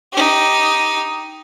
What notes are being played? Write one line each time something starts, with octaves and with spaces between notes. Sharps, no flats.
D#4 G4